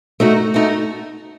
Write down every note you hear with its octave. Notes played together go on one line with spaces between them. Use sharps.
A3 D#4 F#4
A3 D#4 F#4